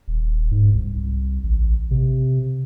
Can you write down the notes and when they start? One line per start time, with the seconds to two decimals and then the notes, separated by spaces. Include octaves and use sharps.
0.08 D#1
0.51 G#2
0.75 C2
1.44 A1
1.91 C3